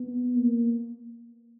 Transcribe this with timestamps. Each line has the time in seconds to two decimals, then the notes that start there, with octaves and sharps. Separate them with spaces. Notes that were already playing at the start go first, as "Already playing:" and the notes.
Already playing: B3
0.35 A#3